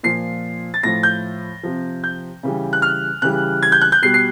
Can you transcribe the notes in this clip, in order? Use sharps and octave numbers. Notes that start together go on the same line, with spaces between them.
A#2 F3 C7
A6
A2 F3 A#6
G6
C3 F3
G6
C#3 E3 G3
F#6
F6
C#3 E3 G3 F#6
G#6
G6
F#6
G6
B2 G3 C7
C7